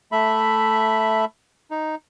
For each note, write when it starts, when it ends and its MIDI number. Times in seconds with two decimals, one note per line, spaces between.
0.12 1.25 57
0.12 1.25 76
0.12 1.25 83
1.71 1.95 63